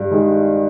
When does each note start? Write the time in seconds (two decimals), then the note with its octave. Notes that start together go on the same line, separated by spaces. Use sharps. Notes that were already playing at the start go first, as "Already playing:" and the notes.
Already playing: G2
0.11 D#3 G#3